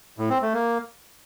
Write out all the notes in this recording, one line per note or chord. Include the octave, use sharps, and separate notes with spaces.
A2
C4
A3
A#3